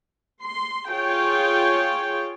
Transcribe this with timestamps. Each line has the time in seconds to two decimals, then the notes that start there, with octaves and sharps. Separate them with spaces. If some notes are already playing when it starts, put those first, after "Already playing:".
0.44 C6
0.90 F4 G#4 C#5 G5